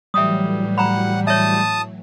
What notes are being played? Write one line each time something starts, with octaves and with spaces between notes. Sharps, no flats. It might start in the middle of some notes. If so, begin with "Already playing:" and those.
A2 E3 F#3 G3 E5 D#6
F#5 A#5 B5
C#5 E5 A5 D#6